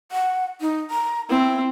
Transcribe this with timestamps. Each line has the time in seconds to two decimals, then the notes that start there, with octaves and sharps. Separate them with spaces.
0.12 F#5
0.61 D#4
0.91 A#5
1.29 C4 E4